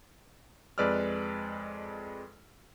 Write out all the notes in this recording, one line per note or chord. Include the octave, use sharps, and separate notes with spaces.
F2 G#3 B4 D5 E6 F6